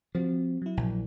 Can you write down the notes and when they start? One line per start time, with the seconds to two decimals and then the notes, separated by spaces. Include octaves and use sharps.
0.15 F3 C4 F#4
0.62 F#3 E4
0.77 A#1